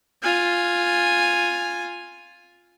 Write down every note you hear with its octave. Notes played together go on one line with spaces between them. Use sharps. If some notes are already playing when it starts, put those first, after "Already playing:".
F4 G#5